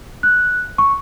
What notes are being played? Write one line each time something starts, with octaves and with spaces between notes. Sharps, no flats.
F#6
C#6